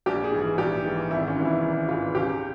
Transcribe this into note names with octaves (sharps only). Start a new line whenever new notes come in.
A#1 G4
G#4
G#2 E3
G#4
A#1 G4
G#2 E3
G#1 E4
C#4
G#2 E3
E4
G#1
G#2 E3 F4
C#2 G4